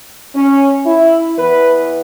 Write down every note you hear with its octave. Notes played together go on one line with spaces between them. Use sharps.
C#4
E4
E2 E3 B3 B4